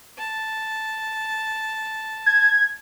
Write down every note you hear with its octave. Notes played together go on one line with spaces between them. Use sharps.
A5
G#6